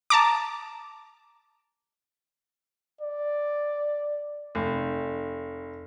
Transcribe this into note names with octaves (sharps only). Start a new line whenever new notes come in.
A5 A#5 D6
D5
F1